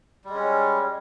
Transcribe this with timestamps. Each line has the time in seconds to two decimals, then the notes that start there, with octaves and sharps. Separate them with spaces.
0.25 G3
0.29 G#3
0.34 C#4